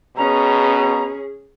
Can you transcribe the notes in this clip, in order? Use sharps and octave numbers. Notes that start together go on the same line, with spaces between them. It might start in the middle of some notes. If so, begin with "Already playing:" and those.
B2 C#4 G#4 A#5